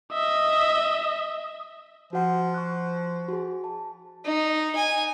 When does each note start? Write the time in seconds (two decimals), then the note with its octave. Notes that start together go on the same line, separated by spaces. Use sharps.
0.13 D#5 E5
2.13 F3 F#4 F#5
2.54 C#6 F#6
3.28 F#4 G#4
3.64 A5
4.25 D#4
4.76 G#5